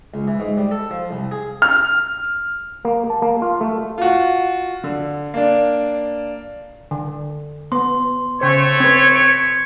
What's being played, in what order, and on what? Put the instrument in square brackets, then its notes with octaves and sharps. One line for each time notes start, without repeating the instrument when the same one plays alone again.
[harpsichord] C#2
E3
G#2
G3
A4
F3
C2
G#4
[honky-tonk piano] F6
[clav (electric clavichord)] A#3
A5
A#3
F4
A3
[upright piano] F4 F#4
D3
A#3 D4
[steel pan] D3
[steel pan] B3 [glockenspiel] C6
[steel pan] C#3 C5 [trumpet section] A3 C#5
[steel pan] C4 B4 [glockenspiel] G#6
[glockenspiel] C#7 D7